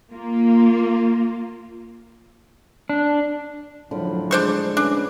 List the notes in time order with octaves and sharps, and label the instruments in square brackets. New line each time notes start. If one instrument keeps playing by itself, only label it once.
[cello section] A#3 F4
[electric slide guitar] D4
[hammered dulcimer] A2 D3 B5 [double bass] F3 F#3
[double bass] G#3 [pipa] D4 C5 C#6
[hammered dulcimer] C#4 B4 [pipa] D4